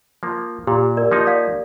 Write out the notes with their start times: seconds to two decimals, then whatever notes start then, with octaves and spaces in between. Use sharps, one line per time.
0.23 F3 A#3
0.67 A#2 G4
0.97 A#4 D5
1.11 F3 A#3 D#4
1.27 D5 F5